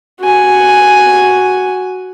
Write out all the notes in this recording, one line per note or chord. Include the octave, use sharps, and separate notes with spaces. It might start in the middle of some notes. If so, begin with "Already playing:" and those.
F#4 G#5